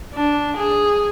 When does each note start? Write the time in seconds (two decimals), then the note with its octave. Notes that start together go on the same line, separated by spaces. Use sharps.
0.14 D4
0.57 G#4